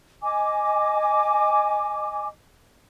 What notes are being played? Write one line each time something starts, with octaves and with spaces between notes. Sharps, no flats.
D#5 G#5 D6